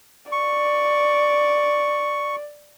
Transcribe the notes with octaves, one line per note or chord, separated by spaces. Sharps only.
D5 C#6